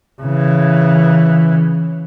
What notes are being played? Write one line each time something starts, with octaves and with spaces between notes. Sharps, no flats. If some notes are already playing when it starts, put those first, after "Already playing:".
C#3 E3